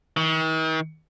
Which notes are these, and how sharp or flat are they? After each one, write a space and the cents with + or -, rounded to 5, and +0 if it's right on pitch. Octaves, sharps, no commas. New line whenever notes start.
D#3 +45